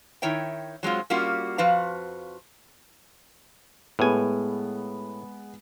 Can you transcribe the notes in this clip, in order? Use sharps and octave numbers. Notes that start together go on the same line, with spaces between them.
D#3 E4 C#5 E5 G5
F#3 G#3 C4 F4
G3 A#3 C#4 F4 F#4
F2 F3 F#4 B4 F5
A2 G#3 B3 G#5